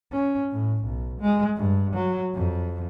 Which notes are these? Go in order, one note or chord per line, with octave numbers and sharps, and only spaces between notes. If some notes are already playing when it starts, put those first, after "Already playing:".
C#4
A2
B1
G#3
G2
F#3
F2